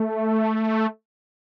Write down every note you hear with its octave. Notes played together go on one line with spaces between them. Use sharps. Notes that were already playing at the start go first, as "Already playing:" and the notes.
Already playing: A3